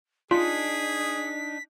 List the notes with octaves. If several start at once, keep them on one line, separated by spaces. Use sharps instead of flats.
D4 D#4 F4 G#4 B6